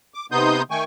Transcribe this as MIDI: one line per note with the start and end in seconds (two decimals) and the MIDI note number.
0.14 0.26 86
0.32 0.62 48
0.32 0.62 59
0.32 0.62 63
0.32 0.62 84
0.32 0.62 87
0.32 0.62 91
0.71 0.84 51
0.71 0.84 57
0.71 0.84 79
0.71 0.84 80
0.71 0.84 85